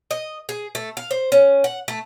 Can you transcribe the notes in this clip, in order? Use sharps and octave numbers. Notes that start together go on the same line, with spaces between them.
D#5
G#4
A3
F5
C5
C#4
F#5
A3